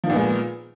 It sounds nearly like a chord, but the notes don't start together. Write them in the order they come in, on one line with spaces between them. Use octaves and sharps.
F3 D#3 A#2 B3 G#3